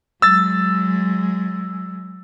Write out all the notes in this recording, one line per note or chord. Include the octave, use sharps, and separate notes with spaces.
F#3 G#3 E6 A6